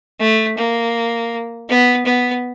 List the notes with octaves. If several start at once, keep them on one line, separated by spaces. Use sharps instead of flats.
A3
A#3
B3
B3